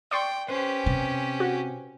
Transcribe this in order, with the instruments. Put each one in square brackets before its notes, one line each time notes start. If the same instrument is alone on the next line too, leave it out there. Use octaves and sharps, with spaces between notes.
[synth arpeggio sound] D5 C6 C#6 [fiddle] G5
[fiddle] C#4 G4 [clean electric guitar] B4 C5
[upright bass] C3
[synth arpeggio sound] F#4